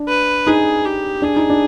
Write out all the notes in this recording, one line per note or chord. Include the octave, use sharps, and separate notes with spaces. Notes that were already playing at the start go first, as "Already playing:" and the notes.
Already playing: D4
B4
D#4 G#4
G4
D4 G#4
D#4
D4